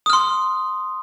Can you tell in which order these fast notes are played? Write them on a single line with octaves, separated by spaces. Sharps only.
D#6 F6 C6